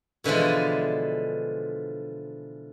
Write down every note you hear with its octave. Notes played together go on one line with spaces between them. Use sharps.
B2 D3 E3 F3 G#3